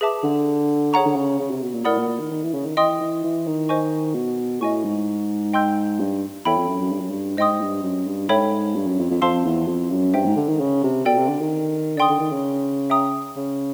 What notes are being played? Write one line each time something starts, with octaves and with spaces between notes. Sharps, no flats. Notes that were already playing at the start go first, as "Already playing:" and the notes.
G#4 B4 E5 A5 D6
D3
G#4 C#5 F#5 A#5 C#6
D3
C#3
C#3
C3
B2
A#2
A2 A#4 D5 F#5 B5 D#6
A#2
A#2
D#3
D#3
E3
C#3
D#3
E3 D#5 G5 C6 D#6
E3
E3
D#3
C5 D#5 G#5 C#6
B2
A2 D#5 G#5 C#6
G#2
D#5 G5 C6 E6 G6
G2
E2 A4 C#5 E5 G5 B5
F2
F#2
F#2
G2
F#2
G2
G#2 C5 D#5 G5 C6 D#6
G2
F#2
G2
G#2 A4 C#5 E5 G5 B5
G2
F#2
F2
F2
F2 C5 F5 A5 C6 E6
E2
F2
F#2
G2 C5 E5 G5
G#2
D3
D#3
C#3
C3
B2 A4 D5 G5
C3
D3
D#3
D3 D5 G5 C6 D#6
D3
D#3
C#3
E5 G5 A#5 D#6
C#3